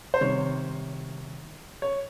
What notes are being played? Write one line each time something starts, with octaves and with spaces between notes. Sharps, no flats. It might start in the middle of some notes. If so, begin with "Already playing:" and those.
C5
C3 D#3 G3 C#5
C#5